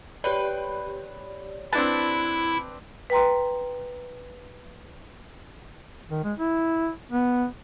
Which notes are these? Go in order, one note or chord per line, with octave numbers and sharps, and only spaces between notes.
G4 B4 C#5 D5 G5
C4 D4 E4 B4 A5
B4 G5 A#5 C6
D#3
G#3
E4
B3